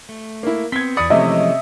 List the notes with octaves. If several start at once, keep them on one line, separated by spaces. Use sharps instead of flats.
A3
A#3 E4
B3 C4 G#6 B6
E2 D5 B5 D#6 C#7
C3 E3 F3 G#3 A3 C#4 D#5 E5